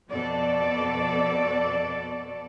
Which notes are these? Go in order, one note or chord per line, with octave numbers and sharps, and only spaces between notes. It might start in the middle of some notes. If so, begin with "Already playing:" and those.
F2 B2 A4 D5